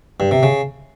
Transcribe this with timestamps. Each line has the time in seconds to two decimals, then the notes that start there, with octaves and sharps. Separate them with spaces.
0.20 G2
0.31 C3
0.43 C#3